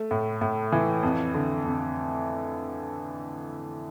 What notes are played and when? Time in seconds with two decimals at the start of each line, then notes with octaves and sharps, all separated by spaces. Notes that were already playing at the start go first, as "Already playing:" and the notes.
Already playing: A3
0.11 A2
0.41 A2
0.72 E3
1.03 F2
1.34 D3
1.65 F2